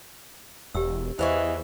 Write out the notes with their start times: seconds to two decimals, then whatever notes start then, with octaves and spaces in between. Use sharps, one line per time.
0.74 E1 G4 E6
1.19 E2 E3 G#4 C5 D#5 F5 C#6